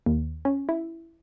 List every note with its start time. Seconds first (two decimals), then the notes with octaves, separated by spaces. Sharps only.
0.06 D#2
0.45 C#4
0.69 E4